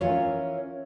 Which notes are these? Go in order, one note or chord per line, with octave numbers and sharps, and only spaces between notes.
E3 C#4 F4 A#4 C#5